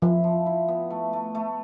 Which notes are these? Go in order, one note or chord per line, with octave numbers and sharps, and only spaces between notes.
F3 E4
F3
E4
B3
A3
A3
A3